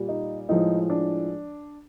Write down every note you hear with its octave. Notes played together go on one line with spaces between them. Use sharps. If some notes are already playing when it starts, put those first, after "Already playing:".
Already playing: A#2 G3
D#4
A2 F3 G#3 D#4
D4